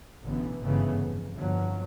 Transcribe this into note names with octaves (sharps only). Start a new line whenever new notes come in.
A1 B2 D3 E3 B3
G1 G#2 C#3 E3 A3 B3
F2
G1 F2 F3 F#3